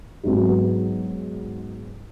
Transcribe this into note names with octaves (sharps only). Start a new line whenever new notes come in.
G#2 F#3 B3